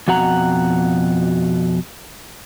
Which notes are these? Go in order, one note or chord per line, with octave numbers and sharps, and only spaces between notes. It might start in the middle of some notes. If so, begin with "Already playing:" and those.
F2 B2 F#4 F#5 A#5